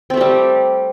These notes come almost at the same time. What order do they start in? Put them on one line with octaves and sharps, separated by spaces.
C4 A3 G4 G3